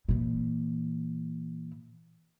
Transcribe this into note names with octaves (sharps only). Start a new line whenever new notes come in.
A#2 E3